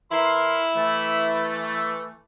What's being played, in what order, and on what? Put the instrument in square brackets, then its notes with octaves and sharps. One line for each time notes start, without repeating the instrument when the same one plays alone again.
[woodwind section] E3 A#4 C6 [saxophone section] E4
[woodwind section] E3 A3